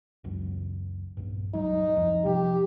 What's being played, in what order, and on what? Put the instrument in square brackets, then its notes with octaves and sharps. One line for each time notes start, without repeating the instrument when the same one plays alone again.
[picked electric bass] F#1 C#2 F#2
A#1 G2
[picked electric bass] C#2 F#3 G3 [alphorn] D#4
[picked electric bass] C2 F2 F3
[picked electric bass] C3 F3 G3 [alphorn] G4